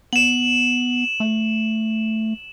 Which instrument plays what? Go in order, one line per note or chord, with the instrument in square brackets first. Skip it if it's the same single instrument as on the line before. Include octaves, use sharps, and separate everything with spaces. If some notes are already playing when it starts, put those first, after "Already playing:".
[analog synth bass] B3 [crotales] E7 F#7
[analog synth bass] A3